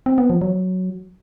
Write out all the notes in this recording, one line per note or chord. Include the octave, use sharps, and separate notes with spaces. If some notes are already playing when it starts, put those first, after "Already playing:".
C4
B3
F3
F#3